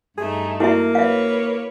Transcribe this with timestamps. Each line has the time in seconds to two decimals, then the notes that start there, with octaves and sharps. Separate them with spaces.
0.18 G2 A3 D#4 G#4
0.60 A#3 E4 F#4 E5
0.95 B4 C#5 E5 F5